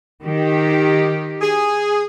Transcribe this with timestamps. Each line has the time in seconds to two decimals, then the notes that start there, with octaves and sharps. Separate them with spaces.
0.23 D#3 G4
1.41 G#4